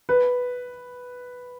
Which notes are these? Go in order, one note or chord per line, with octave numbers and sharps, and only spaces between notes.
B4